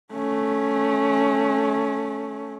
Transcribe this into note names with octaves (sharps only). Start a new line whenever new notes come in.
A3 C#4